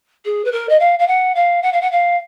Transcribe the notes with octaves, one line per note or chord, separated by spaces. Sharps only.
G#4
B4
A#4
D#5
F5
F5
F#5
F5
F#5
F5
F#5
F5